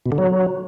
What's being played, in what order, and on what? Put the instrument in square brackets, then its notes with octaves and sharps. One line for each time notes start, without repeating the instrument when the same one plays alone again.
[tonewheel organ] B2
D3
F#3